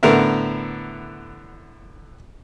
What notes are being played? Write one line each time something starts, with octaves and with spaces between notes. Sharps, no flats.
A2 D3 B3 A#4 E5